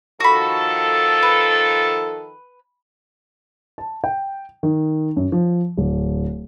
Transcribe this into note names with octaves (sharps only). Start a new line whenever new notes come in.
D#3 F3 F#4 A4 B5
B4
A5
G5
D#3
F#2
F3
D1